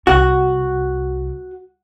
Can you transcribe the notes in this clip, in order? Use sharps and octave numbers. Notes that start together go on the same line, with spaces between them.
C2 F#4